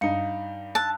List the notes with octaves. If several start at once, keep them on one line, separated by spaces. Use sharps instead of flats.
G2 D#4 F5 C#7
A5 E6 F#6